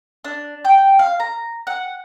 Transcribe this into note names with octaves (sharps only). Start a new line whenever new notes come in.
D4
G5
F5
A#5
F#5